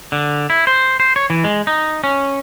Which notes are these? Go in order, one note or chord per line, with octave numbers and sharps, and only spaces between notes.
D3
E4
C5
C5
C#5
E3
G#3
D#4
C#4